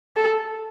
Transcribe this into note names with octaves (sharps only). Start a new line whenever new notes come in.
A4